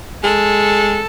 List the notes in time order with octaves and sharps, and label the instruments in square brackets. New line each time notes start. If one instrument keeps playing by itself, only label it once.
[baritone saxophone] G#3 [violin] A4